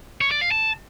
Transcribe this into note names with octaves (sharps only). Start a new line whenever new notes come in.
C#5
D5
F5
A5